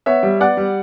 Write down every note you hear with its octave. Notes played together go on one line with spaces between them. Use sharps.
B3 C#5 E5
G3
B3 D5 F#5
G3